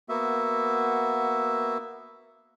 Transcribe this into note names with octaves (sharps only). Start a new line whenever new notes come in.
A#3 B3 F#4 E5